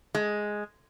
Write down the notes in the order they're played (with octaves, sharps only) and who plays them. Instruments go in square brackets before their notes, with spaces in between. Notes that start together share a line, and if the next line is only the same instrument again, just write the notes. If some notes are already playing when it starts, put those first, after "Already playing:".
[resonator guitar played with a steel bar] G#3